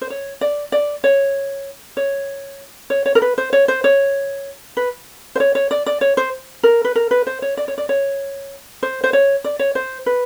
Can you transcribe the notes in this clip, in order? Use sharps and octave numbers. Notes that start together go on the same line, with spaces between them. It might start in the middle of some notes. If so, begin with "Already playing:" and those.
C5
C#5
D5
D5
C#5
C#5
C#5
C#5
A#4
B4
C5
C#5
C5
C#5
B4
C5
C#5
C#5
D5
D5
C#5
C5
A#4
B4
A#4
B4
C5
C#5
D5
C#5
D5
C#5
C5
C5
C#5
D5
C#5
C5
B4